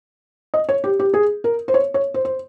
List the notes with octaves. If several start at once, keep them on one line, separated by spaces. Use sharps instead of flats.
D#5
C#5
G4
G4
G#4
A#4
C5
C#5
C#5
C5
C5